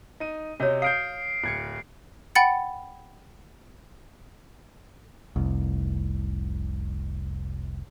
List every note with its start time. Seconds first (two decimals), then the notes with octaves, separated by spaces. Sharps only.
0.20 D#4 D#7
0.60 C3 F#4 C#5 D#5
0.82 F5 D#6 F6 G6 C7 D7
1.44 D1 G#6 C#7
2.35 F#5 G5 B5 A6 C#7
5.36 F1 C2